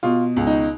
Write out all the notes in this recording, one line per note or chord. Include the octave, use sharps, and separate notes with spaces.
B2 F4
C#2
D#4